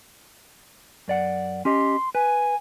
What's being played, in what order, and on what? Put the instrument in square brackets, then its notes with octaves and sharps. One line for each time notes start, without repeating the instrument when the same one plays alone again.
[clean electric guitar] F#2 D5 F#5
[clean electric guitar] C#4 G4 D#5 [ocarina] C6
[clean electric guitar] B4 [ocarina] G#5